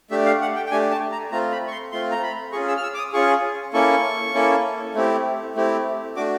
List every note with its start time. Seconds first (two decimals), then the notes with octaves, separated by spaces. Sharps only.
0.11 A3 D4 G4 E5
0.26 F5
0.41 F#5
0.56 G5
0.66 G5
0.71 A3 D4 G4 G#5
0.91 A5
1.12 A#5
1.31 A3 C4 F4 A#5
1.52 B5
1.67 C#6
1.71 C6
1.92 A3 C4 F4 C6
2.11 A#5
2.23 B5
2.52 C#4 F4 G#4 C#6
2.68 E6
2.77 F6
2.83 E6
2.94 D6
2.98 D#6
3.13 C#4 F4 G#4 C#6
3.73 A#3 C#4 E4 A4 C#6
4.34 A#3 C#4 E4 A4
4.95 A3 C4 E4 G4
5.56 A3 C4 E4 G4
6.16 A3 D4 F#4 D6